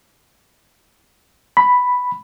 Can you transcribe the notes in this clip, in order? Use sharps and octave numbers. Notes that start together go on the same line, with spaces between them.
B5